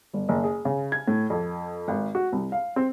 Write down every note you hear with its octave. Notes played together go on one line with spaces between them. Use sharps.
G1
F#1
G#4
C#3
G#6
A2
F2
G#1
F#4
C2
F5
C4